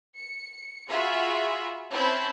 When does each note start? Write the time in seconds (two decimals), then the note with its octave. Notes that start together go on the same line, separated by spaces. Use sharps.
0.18 C#7
0.89 F4 F#4 G#4 E5 B5
1.92 C4 C#4 E4 A5 B5 G6